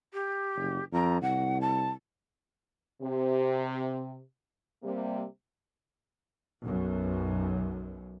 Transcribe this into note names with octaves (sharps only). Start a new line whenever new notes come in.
G4
F#1
F2 A#5
C2 F#5
A5
C3
C3 G3 A#3
B1 F#2